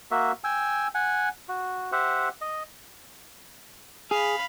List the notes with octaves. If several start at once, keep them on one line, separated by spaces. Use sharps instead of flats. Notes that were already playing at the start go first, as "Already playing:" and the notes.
A#3 F#4 E5
G5 G#5 E6
F#5 G#5
F#4
G4 C5 E5 F#5
D#5
G#4 F5 B5